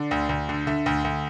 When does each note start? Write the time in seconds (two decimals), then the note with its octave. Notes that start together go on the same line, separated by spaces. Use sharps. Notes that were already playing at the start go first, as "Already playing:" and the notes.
Already playing: D3 D5
0.11 D2
0.29 D2
0.49 D3
0.67 D3 E5
0.86 D2
1.04 D2